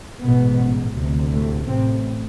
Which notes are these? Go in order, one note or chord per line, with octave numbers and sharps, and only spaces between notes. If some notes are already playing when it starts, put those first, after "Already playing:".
A1 G#2 B2 B3
D2 C3
A2 A3
A1 A2 C3 C4